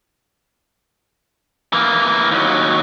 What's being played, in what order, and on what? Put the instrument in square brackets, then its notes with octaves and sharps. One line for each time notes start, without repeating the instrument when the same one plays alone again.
[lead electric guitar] E3 A#3
D#2 F#3